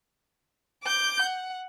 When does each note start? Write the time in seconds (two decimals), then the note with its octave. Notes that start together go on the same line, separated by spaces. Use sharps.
0.83 D6 G6
1.22 F#5